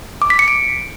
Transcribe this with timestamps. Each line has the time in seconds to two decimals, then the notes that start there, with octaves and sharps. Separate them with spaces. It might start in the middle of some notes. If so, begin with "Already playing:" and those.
0.22 D6
0.30 B6
0.39 C#7
0.48 D7